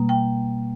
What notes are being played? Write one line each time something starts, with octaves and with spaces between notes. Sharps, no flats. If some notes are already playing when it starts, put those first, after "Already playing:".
Already playing: B2 G3 A#3
G5